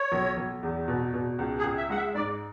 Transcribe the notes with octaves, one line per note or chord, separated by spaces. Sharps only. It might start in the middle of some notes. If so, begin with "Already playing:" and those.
Already playing: C#5
B1
B1
E2
B2
B2
C#2
G#4
C#2
E5
G#3 F#5
E5
G#2 D5